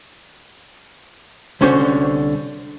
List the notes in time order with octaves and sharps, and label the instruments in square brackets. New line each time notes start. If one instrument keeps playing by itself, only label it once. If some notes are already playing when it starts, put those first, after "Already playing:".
[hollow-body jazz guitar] C2 D3 C#4 F#4 C5 C#5